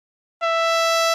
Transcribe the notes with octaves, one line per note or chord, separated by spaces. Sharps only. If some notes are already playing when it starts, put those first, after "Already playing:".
E5